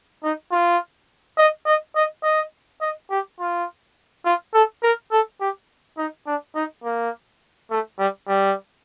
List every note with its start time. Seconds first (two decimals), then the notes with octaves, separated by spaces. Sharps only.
0.24 D#4
0.52 F4
1.38 D#5
1.66 D#5
1.96 D#5
2.24 D#5
2.81 D#5
3.11 G4
3.39 F4
4.25 F4
4.54 A4
4.83 A#4
5.11 A4
5.41 G4
5.97 D#4
6.27 D4
6.55 D#4
6.84 A#3
7.71 A3
7.99 G3
8.28 G3